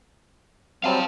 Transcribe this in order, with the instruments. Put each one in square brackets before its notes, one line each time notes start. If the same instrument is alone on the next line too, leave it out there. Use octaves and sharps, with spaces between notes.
[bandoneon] F#3 G3 C4 [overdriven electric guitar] F5 A5